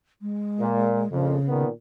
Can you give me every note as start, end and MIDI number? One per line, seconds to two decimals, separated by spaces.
0.21 1.11 56
0.60 1.02 46
1.12 1.36 34
1.12 1.36 41
1.12 1.63 49
1.48 1.69 46
1.48 1.69 51
1.48 1.69 59